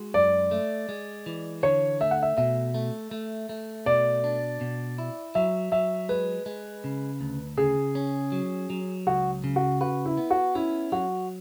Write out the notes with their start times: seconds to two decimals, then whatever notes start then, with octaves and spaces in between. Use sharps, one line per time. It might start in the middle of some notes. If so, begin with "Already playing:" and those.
Already playing: G#3 F#4
0.14 F#2 D5
0.51 A3
0.89 G#3
1.26 E3
1.63 D3 C#5
2.01 A3 E5
2.11 F#5
2.23 E5
2.37 B2 E5
2.74 A3
3.11 A3
3.49 A3
3.86 B2 D5
4.24 D4
4.61 B2
4.98 E4
5.35 F#3 E5
5.72 F#3 E5
6.09 G#3 B4
6.46 G#3
6.84 C#3
7.21 D2
7.57 C#3 G#4
7.95 C#4
8.32 F#3
8.70 F#3
9.07 C#2 F#4
9.44 C#3
9.56 F#4
9.81 F#4 B4
10.06 E4
10.17 B3
10.31 F#4
10.55 C#4 E4
10.92 F#3 F#4